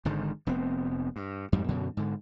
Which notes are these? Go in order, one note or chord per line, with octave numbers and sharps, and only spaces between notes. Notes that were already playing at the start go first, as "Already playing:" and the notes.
G#1 G#2 D3 D#3
F1 B3 C4
G2
F2 G#2 G3
F#2 B2 D3
G#2 D3